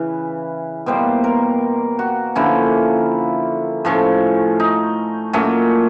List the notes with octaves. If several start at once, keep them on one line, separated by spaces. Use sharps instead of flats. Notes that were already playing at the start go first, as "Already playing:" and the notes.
Already playing: C#3 E3
B2 G3 A#3 C5
A#4
F#4
D3 F3 A#3 C#4 E4
A2 F3 A3 C#4
D#4
A#2 F#3 A3 C#4